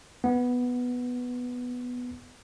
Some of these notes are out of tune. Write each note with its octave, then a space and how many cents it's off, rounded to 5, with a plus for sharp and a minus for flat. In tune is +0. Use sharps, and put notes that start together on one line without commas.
B3 +0